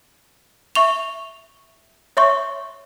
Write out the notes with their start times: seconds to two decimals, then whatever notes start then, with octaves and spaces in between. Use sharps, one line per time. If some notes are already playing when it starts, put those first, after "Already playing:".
0.75 E5 C#6 F7
2.17 C#5 E5 C6 C#6